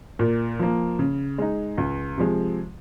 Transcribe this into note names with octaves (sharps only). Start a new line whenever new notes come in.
A#2
F3 A#3
C#3
G#3 D#4
C#2
C3 F3 G#3